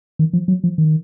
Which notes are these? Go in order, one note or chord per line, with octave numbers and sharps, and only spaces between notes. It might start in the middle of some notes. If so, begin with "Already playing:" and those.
D#3
F3
F#3
F3
D#3